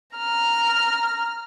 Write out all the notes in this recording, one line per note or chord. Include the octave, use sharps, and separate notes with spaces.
A#5 F6